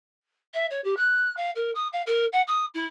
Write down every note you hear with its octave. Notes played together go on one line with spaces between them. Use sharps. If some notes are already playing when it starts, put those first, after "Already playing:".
E5
C#5
G4
F#6
F5
A#4
D#6
F5
A#4
F#5
D#6
E4